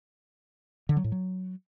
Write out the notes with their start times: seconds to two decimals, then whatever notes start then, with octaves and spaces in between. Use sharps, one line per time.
0.89 D3
0.97 F#3
1.04 A2
1.12 F#3